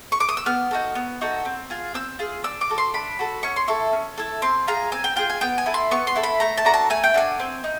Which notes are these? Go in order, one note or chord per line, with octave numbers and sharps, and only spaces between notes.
C#6
D6
D#6
E6
B3 F6
D#4 F#4 A4
B3
D#4 F#4 A4
C4
F4 G#4
C4 E6
F4 G#4
D4 E6
D6
F#4 A4
C6
D4 B5
F#4 A4
C#4 C#6
C6
E4 A4 C#6
C#4
E4 A4
C4 C6
F4 G#4 A#5
C4 G#5
G5
F4 G#4 G5
G#5
B3 G5
G#5
E4 A4
C6
B3 C#6
C6
E4 A4
B5
A3 A#5
A5
D4 F#4 A4 A#5
A5
A3 G#5
G5
D4 F#4 A4 G#5
C4
D#4